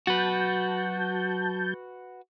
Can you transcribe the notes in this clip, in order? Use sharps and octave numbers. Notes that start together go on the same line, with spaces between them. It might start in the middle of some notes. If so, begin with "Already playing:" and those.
F#3 F#4 B4 A5 G6